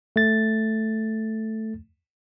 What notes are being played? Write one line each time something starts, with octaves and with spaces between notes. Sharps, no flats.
A3 A6